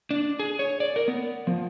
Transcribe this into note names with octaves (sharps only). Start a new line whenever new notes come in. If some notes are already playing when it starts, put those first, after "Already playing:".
D4
G#4
C#5
D5
A#4
B3
F3